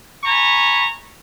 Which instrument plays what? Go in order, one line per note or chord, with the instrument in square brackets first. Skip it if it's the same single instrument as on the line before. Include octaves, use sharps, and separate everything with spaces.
[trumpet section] G#5 A#5 B5 C#6